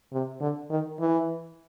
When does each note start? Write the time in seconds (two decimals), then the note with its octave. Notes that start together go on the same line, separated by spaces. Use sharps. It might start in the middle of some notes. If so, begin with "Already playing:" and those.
0.12 C3
0.41 D3
0.70 D#3
1.00 E3